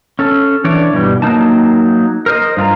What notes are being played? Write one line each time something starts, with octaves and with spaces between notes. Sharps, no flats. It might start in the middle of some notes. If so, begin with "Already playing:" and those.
C#4 A4
E3 D4 C#5 D5
G2 B2 E3 G3
F#3 A#3 D#4 A5
A#4 C5 D#5
G2 F4 G#4 A#5